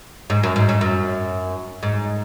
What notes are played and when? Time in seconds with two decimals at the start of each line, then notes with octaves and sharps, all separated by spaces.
0.30 G#2
0.43 F#2
0.56 G#2
0.69 G#2
0.81 F#2
1.83 G#2